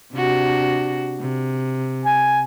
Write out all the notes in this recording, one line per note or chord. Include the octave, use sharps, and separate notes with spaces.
C3 D4 F#4
C3
G#5